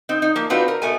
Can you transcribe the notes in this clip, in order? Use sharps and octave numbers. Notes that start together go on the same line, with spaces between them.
C4 D#4
D#4
F3 A#3
C4 D4 D#4 F4 F#4 B4
A#4
B2 A3 G#5